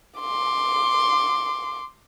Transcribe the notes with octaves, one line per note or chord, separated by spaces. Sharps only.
C6 D6